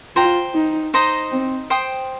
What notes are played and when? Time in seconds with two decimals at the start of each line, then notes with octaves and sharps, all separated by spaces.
0.16 F4 C5 G5 A#5
0.55 D#4
0.94 D#4 C5 D#5 A#5
1.32 C4
1.70 C5 G5 D#6